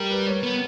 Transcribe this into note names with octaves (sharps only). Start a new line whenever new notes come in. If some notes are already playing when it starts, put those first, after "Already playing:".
Already playing: G3 G4 A#4
B4
C#5
B3